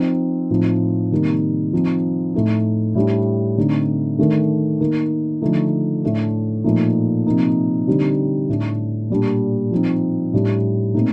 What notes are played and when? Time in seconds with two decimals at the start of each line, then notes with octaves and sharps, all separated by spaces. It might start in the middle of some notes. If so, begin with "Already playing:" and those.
Already playing: F3 C4 D#4
0.50 A2 F3 C4 D#4
1.11 C3 D#3 G3 A#3 D#4
1.73 F3 C4 D#4
2.34 A2 A3 D#4
2.95 A2 G3 D4
3.57 D3 A3 C4 D#4
4.19 D#3 A3 D4
4.80 D#3 A#3 D#4
5.42 D3 F3 A3 D#4
6.04 A2 A3 D4
6.64 A#2 F3 A3 D#4
7.27 C3 F3 A#3 D#4
7.87 D3 G3 C4 D#4
8.49 A2 A3 D4
9.10 A#2 G3 D4
9.71 F3 C4 D#4
10.33 A2 G3 D4
10.94 A#2 A3 C4 D#4